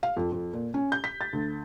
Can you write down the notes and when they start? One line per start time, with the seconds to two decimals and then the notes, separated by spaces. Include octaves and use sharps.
0.03 F5
0.17 F2
0.32 F2
0.53 A#2
0.74 C#4
0.92 G6
1.04 B6
1.21 A6
1.33 D2